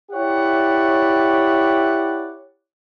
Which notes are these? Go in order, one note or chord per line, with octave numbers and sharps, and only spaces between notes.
E4 G4 C#5 D5 F#5